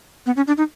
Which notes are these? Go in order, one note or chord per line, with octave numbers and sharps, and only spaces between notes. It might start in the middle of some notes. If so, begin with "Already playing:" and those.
B3
C#4
D4
D#4